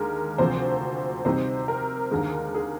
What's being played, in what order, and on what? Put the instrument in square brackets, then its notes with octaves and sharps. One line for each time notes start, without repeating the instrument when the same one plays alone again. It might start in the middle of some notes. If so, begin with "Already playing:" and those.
Already playing: [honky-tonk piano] D#2 D3 G#3 A#4
D2 C3 F3 C5
C3 G3 C4 D#4 C5
A#4
D#2 D3 G#3
G#4